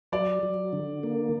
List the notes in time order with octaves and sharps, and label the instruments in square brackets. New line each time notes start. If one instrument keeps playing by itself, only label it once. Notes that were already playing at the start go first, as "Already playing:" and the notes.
[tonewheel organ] F#3 [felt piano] D5
[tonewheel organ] F#3
D3
A#3